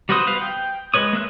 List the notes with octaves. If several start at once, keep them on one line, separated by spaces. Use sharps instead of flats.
G3 F#4 B4 C5 D#6
B3 B4 F5
G5
G#3 B4 C#5 D#6
A#3 E5 F#6